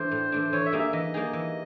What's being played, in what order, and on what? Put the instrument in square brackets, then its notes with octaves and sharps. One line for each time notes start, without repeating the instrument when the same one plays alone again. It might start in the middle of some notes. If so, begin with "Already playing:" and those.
Already playing: [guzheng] E3 A3 D4 [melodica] C5
[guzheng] A2
E3 A3 D4
[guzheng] E3 [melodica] C#5
[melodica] E5
[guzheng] G3 A#3 D#4 G#4
[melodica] E5
[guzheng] E3 [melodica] D#5
[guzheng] G3 A#3 D#4 G#4
E3